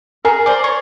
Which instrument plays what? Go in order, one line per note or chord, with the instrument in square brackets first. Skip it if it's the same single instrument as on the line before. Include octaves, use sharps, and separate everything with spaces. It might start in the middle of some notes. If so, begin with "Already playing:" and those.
[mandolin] G#4 [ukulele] A#4
[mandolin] C5 D5
C#5